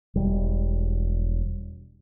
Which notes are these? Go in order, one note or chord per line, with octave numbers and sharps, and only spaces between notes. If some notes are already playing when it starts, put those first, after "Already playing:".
E1 G3